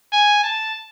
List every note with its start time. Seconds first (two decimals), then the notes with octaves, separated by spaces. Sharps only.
0.12 G#5
0.43 A5